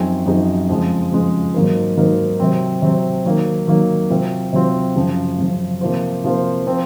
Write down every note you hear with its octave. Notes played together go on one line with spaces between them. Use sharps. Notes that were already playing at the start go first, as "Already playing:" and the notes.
Already playing: F#2 F3 C4 D#4 G#4
F#2 F3 C4 D#4 G#4
F2 C#3 F3 G#3
F2 C#3 F3 G#3
G#2 F#3 A#3 D#4 A#4
G#2 F#3 A#3 D#4 A#4
C3 F#3 C4
C3 F#3 C4
D#3 F#3 A#3
D#3 F#3 A#3
C3 F#3 C4 F4
C3 F#3 C4 F4
F#2 C#3 F3
F#2 C#3 F3
C3 F3 A#3 F4 C5
C3 F3 A#3 F4 C5
F3 C4